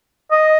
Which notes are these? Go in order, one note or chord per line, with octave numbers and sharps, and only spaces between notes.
D#5